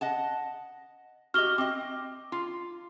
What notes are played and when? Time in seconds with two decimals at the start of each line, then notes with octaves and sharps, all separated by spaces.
0.01 D#5 F#5 A5
1.34 F#4 G4 D#5 F6 G7
1.58 C4 D#5 D6
2.32 F4